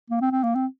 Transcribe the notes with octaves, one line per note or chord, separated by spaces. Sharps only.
A#3
C4
C4
A#3
C4